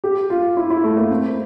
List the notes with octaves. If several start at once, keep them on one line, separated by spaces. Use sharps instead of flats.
G4
F4
E4
E4
A3
A#3
C4